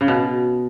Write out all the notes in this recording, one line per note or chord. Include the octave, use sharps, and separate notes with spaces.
C#3
B2